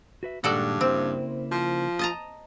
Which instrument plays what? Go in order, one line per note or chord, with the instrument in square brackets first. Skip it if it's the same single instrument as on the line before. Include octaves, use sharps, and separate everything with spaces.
[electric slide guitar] F#4 B4 E5
[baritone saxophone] G2 [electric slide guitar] A#2 D#3 G#3 [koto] F#4 A4 D5
[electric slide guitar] C#3 A#3 E4 [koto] C4
[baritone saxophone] F3
[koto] D#5 A5 A#5